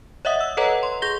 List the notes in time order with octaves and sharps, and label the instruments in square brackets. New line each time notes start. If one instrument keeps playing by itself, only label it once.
[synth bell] C#5 D#5 E5 F#5 D#6
E6
A4 B4 C#5 D#5 F#5 A#5
C6
G#4 C6 G6 A#6 G7